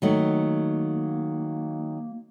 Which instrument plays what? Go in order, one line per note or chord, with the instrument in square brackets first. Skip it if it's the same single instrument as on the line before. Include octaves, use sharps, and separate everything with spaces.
[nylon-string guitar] D#3 F#3 A3 [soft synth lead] A#3